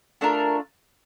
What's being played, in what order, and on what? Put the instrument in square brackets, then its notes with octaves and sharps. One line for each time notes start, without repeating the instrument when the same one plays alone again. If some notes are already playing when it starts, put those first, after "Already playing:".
[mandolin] A3 D4 F4 A#4